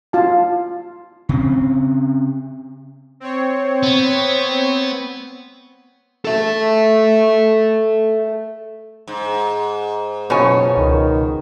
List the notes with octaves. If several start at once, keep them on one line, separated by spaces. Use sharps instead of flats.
F4 A5
C#3 C4
C4 C#5
B3
A4 E5
G#2
F#1 B2 F4 C#5 G#5
C#2 D#3